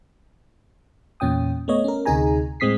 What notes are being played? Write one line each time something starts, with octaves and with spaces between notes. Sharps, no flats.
E2 A#2 C#4 G5 D#6
A3 B3 C#5 D#5
C#4 A#4
D2 C3 D#4 G#4 G#5 A#5
A2 G#3 C4 D#6 B6 C7